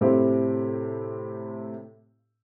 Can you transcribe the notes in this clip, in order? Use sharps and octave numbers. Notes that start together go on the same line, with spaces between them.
A2 C3 C4 E4 G4